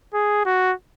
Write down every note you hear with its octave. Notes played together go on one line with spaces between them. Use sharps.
G#4
F#4